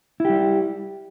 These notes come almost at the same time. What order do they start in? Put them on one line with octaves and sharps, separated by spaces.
E4 G4 G3